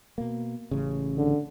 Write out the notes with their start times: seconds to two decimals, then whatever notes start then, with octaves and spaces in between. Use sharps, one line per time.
0.18 B2 A#3
0.71 A1 C#3
1.17 D3